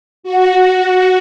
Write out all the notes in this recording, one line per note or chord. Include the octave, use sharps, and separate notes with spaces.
F#4